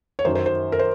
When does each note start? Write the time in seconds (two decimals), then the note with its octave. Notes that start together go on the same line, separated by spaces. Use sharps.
0.19 C#5
0.25 F#2 D#3 F#3 C5
0.35 C5
0.46 C5
0.72 A#4
0.79 C5